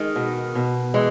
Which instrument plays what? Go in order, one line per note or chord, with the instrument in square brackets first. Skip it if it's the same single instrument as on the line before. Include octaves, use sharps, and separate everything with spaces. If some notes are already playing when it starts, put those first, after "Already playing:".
Already playing: [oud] D#3 [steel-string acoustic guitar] G#3
[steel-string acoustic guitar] B2
B2
[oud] E3 [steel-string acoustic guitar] G#3